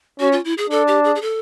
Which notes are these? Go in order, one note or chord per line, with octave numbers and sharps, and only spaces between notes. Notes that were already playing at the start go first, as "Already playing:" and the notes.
C#4 F#4
F4
E4
G#4
D4 A4
G4
G#4
G#4
A4